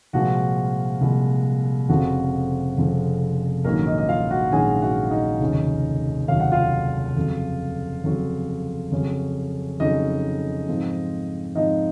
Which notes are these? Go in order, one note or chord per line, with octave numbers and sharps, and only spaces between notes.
C2 A#2 F3 G#3 F#4
C2 A#2 F3 G#3
F1 F2 C#3 F3 C4 F#4
F1 F2 C#3 F3 C4
A#1 G#2 D#3 F#3 A#3 C#4 A#4
D#4 D#5
D#5
F4 F5
F#4 F#5
A#1 G#2 D#3 F#3 C#4 G#4 G#5
F#4 F#5
D#4 D#5
F1 D#2 C#3 F#3 C#4
F1 D#2 C#3 F#3 C#4 F5
F#5
F4 F5
F2 C#3 F#3
F2 C#3 F#3
F2 C#3 F#3 C#4
F2 C#3 F#3 C#4 D#4 D#5
G#2 F3 C4
G#2 F3 C4 D#4 D#5